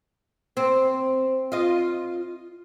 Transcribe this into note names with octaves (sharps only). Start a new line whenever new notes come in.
C4
F4 D#5